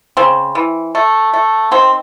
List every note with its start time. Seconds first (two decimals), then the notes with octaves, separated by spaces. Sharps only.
0.17 C#3 C4
0.55 E3
0.95 A3
1.33 A3
1.71 D#3 C4